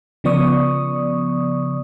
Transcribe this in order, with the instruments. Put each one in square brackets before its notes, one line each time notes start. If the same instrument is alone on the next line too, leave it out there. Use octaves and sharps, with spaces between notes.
[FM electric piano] C#3 F3 B3 D5 C#6 D#6